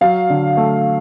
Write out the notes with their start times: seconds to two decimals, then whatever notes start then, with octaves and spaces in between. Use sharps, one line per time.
0.01 F#3 F5
0.30 D3
0.57 A3